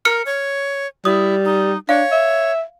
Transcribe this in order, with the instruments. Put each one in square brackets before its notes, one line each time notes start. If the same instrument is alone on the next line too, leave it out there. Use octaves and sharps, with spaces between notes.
[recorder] A#4 [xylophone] F6 C#7
[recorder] C#5
[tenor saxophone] G3 [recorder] E4 [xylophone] D#6
[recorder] D#4
[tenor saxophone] D4 [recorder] C#5 [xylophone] F5
[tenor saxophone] E5